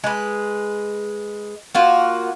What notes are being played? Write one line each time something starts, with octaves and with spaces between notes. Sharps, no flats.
G#3 B4
A#3 F4 F#4